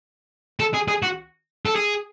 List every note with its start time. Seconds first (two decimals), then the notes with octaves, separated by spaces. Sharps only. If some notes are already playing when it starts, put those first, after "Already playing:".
0.60 A4
0.74 G#4
0.88 G#4
1.02 F#4
1.66 A4
1.76 G#4